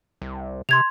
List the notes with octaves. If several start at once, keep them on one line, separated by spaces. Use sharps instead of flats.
C2
C3 C6 G#6 F7